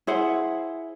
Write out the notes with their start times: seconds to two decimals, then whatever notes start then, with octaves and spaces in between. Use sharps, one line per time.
0.07 E4 G#4 C5 F#5